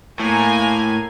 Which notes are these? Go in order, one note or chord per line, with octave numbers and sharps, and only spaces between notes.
A2 A#3 G#5